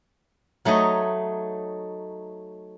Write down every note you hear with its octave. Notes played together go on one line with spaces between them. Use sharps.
F#3 A3 D#4 C#5 D#5